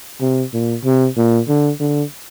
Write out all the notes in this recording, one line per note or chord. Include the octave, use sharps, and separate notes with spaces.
C3
A#2
C3
A#2
D3
D3